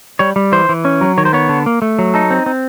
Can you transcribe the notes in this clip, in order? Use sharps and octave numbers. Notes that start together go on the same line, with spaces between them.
G3 C#5
G3
E3 C5
E3
C#4
F#3
D#3 C#5
C5
B3 C#5
D3
A#3
A3
F#3
D#4 A4
C4
C4